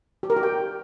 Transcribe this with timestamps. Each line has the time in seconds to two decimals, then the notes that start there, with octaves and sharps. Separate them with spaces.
0.23 G4
0.30 A#4
0.36 G4
0.43 G5